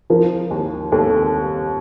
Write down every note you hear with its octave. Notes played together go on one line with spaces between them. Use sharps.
F3 A#4
D#2
D#2 A4